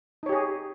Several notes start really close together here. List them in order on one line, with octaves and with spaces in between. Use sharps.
D#4 C#5 G4 G#4